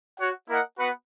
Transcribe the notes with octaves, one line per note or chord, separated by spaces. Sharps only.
F#4 C#5 F#5
A#3 E4 A#4 D#5 F#5
B3 F#4 B4 F#5